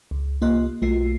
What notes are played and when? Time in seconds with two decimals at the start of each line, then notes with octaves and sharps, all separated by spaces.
0.11 C#2
0.41 C2 A#3 F4 D#5 C6 F#6
0.82 B1 A3 F4 C7